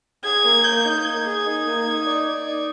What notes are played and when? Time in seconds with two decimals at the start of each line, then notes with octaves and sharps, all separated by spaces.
0.24 G#4 G#6
0.45 A#3
0.64 A#3 G6
0.85 D#4
1.05 A#3 G#6
1.26 G#4
1.46 D#4
1.66 A#3
1.86 D#4
2.06 D5
2.27 D5
2.47 D#4